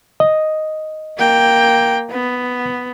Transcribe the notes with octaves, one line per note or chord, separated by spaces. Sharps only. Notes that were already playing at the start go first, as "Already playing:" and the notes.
D#5
A#3 G5
B3